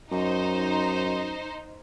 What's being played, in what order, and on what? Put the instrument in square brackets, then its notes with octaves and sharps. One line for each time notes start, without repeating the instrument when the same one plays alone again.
[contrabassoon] F#2 [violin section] D#4 C5